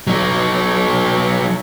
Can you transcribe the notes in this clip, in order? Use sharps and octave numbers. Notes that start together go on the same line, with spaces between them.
F#3 D#4